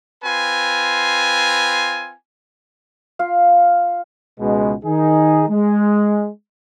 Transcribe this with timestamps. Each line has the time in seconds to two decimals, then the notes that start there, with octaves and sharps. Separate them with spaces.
0.23 C4 F4 B4 G#5
3.19 F4 F5
4.40 C#2 B2 G#3
4.85 D#3 D#4 G#4
5.49 G#3